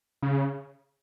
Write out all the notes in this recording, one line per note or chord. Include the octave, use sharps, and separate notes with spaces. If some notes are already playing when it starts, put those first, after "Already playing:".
C#3